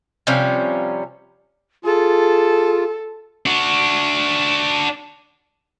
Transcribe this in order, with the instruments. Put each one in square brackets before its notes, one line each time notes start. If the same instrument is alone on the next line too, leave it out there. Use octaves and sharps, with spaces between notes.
[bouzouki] C3 F3 G3 C#4
[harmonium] F4 [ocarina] G#4 [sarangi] A4
[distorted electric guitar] D4 F#4